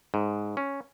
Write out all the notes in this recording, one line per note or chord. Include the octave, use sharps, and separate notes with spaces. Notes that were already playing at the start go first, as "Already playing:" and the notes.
G#2
C#4